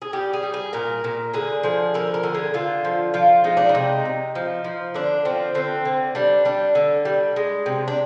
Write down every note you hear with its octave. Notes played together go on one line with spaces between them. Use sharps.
G#4
G3 G4
G#4
G3
G#4
A#2 A#4
A#2
D3 G#4
F3 G#4
D3 A#4
A#4
D3
G#4
D3 F4
F3
F3 F4
G#3 D#4
D4
D#4
C3
C3
F3
F3
D3 D4
F3 C4
D3 C4
D3
G3 D4
G3 D4
D3
G3
G#3
C3
D4